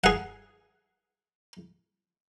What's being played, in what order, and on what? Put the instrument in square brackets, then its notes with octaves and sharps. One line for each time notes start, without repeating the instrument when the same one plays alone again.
[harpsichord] G#4 F#5